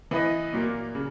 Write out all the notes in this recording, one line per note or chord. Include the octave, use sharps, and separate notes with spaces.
E3 B3 E4 B4 D#5
A#2 F#3 A#3
C#3